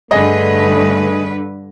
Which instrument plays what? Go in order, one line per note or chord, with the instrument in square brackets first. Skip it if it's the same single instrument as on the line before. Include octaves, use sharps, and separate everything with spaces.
[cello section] G2 D3 B4 [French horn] A3 [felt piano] G#4 D#5